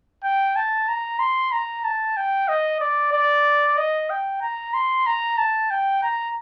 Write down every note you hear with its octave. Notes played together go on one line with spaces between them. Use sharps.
G5
A5
A#5
C6
A#5
A5
G5
D#5
D5
D5
D#5
G5
A#5
C6
A#5
A5
G5
A#5